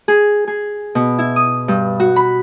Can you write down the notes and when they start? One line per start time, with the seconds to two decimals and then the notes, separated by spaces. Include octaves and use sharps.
0.08 G#4
0.47 G#4
0.95 B2
1.18 E4
1.36 D#6
1.68 G2
2.00 F#4
2.16 B5